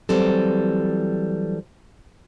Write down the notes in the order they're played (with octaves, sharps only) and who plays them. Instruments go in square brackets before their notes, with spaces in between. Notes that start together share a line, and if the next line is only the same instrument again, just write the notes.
[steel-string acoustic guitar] E3 F#3 G3 C4 A4